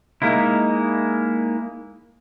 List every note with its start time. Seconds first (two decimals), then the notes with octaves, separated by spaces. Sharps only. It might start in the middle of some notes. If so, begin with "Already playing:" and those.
0.22 G#3 A#3 D#4 E4